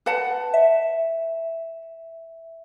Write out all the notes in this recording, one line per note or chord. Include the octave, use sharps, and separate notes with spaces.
B4 F#5 A5
E5